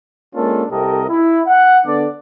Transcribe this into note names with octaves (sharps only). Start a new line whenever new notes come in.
G#3 A#3 C#4 D4 F4 A4
C2 C3 G4 A4 A#4 D#5
E4
F#5
D3 B3 D4 D5